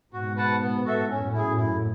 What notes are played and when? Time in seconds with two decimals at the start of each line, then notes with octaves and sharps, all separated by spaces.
0.12 G#2 B2 F#4
0.37 B4 F#5 A5
0.61 B3
0.85 F#4 A4 E5
1.09 F#2 A2 C#4
1.33 E4 G#4
1.57 E4